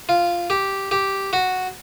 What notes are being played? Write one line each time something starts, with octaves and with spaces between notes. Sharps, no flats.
F4
G4
G4
F#4